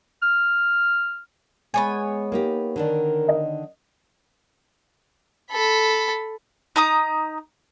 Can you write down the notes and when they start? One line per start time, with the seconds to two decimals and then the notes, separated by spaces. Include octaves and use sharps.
0.23 F6
1.74 G#3 B3 C#5 G#5
2.32 A#3 D#4 G4
2.76 D3 D#3 D4 A#4
3.28 D#5
5.52 A4 B5
6.76 D#4 A#5 D#6